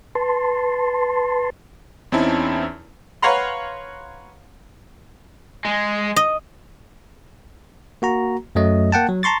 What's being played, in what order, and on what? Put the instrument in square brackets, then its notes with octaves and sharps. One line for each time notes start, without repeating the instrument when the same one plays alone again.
[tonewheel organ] B4 A5 C6
[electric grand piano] E2 C4 C#4 D#4 E4 A5
[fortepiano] B4 C#5 F5 F#5 A#5 C6
[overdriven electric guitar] G#3
[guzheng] D#5
[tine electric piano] A#3 F#4 A#5
F#2 F#3 A3 D#5
A#3 F#5 G5 A5
F#3
A5 A#5 C6 C#6 A6